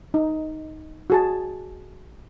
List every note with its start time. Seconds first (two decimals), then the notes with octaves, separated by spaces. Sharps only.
0.14 D#4
1.10 F#4 G#4 A5